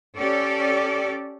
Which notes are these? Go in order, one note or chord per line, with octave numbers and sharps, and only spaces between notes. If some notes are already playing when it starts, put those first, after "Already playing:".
C#4 G4 A4 D5